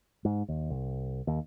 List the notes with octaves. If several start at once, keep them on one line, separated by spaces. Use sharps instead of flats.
G#2
D#2
C2
D#2